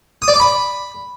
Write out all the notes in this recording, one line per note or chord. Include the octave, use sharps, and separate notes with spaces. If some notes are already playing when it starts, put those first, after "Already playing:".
D#6
D5
D6
B5